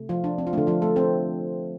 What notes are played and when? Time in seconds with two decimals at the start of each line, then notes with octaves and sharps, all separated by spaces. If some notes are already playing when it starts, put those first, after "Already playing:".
Already playing: C3 A3
0.09 F3 F4
0.24 D4
0.38 C4
0.47 F4
0.53 D3 A3 D4
0.67 F3 F4
0.82 A3 A4
0.96 C4 C5